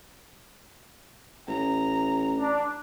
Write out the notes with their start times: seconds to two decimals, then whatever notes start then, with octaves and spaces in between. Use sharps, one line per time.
1.48 A1 A#5
2.36 D4